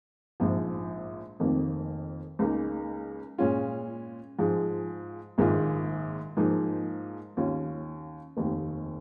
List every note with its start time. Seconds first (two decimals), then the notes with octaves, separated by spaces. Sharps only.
0.40 A#1 G#2 F3
1.40 F1 F2 D#3 A#3
2.39 C#2 C#3 A#3 D#4
3.38 A#2 G#3 C#4 F4
4.39 G#2 F3 G#3
5.38 A#1 G#2 D#3 A#3 F4
6.37 G#2 F3 A#3 D#4
7.37 D#2 D#3 C#4 F4
8.37 F1 D#2 D#3